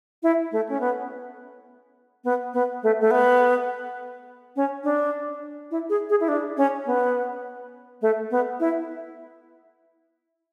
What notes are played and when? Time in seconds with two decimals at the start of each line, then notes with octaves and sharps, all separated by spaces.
0.23 E4
0.52 A3
0.69 C#4
0.81 B3
2.24 B3
2.54 B3
2.83 A3
3.01 A3
3.11 B3
4.56 C#4
4.84 D4
5.71 E4
5.90 G#4
6.10 G#4
6.20 E4
6.28 D4
6.57 C#4
6.86 B3
8.02 A3
8.31 B3
8.60 E4